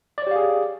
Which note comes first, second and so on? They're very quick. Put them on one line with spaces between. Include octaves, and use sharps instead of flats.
D5 C#5 G4 F5 G#4